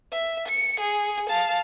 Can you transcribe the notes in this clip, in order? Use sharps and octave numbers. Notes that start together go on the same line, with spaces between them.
E5
C#7
G#4
F5 A5